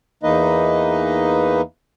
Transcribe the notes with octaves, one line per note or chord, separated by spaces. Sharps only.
E2 E3 A#3 D#4 B4 D#5